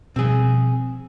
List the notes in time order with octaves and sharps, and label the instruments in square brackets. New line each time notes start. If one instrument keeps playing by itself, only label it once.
[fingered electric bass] B2 F3 G3 [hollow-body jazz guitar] C4 G#4